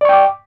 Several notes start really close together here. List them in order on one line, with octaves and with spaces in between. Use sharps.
D5 C#6 G5 D6